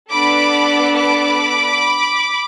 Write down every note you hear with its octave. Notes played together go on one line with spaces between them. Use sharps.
B3 D4 A4 B5 D6
B5 D6